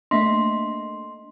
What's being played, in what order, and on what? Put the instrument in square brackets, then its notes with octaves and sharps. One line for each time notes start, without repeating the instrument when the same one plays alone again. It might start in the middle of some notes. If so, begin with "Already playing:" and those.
[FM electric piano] A3 A#3 D4 [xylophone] D#5 E5 [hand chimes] C6